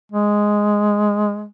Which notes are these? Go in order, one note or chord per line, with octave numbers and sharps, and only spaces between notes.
G#3